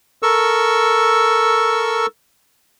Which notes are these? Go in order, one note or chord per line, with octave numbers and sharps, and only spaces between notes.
A4 A#4 C#6 E6